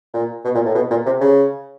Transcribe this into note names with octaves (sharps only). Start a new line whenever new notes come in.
A#2
B2
A#2
A2
B2
A#2
C3
C#3